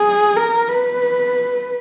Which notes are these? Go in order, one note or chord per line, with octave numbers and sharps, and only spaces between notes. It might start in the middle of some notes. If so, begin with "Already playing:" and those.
Already playing: G#4
A#4
B4